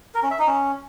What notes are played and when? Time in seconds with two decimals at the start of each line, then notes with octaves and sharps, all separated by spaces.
0.15 A#4
0.23 C#4
0.31 E5
0.39 D#4
0.47 C#4